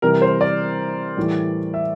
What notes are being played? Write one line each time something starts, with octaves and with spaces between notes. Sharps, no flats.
C3 E3 G3 A#4
C5
D5
A2 E3 G3
E5